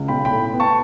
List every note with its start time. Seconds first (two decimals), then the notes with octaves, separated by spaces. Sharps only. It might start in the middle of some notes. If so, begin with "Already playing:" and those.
Already playing: C#2
0.08 B1 G5 B5
0.25 G5 B5
0.31 A2
0.54 B3
0.60 A5 C#6